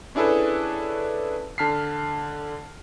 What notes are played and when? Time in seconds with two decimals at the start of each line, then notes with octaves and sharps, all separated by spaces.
0.15 C#4 D4 E4 G#4 A4 B4
1.58 D3 A5 F6 B6 C7